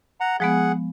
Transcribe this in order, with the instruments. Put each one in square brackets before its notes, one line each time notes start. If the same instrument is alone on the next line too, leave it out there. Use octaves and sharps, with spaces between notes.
[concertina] F#5 A#5
[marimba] F3 G#3 B3 [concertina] G#4 F#5